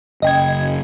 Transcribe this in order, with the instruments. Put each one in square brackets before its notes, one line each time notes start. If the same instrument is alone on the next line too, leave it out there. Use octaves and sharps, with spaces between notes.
[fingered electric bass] F#1 [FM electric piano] D#5 G5 G#6